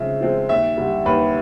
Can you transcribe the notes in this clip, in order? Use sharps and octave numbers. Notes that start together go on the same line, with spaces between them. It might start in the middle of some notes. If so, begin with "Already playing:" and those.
Already playing: C#3 F3 G#3 C4 E5
F3 G#3 C4 F4
D#2 E5
D3 G3
D#2 B4